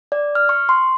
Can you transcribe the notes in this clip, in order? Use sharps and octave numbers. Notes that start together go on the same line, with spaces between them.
D5
F6
C#6
C6